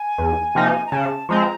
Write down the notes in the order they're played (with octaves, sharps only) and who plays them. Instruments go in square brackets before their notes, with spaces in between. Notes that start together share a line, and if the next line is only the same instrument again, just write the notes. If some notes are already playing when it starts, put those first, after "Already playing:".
Already playing: [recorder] G#5
[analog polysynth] E2
C3 F3 A#3 D#4
[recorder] A#5
[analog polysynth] C#3 [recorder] A5
[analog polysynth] F3 G#3 C4 [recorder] A#5